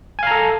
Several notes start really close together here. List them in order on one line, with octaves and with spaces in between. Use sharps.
G#5 F5 A#5 A4